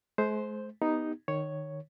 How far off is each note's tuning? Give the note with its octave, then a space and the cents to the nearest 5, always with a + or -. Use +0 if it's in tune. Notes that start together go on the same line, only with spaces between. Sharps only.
G#3 +45 C5 +0
B3 +0 D#4 +0 G4 +0
D#3 -20 C#5 +0